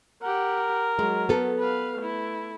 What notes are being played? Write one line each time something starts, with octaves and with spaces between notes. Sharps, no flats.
G4 A#4 F#5
F#3 G#3
B3 A4
B4 F5
A3 E4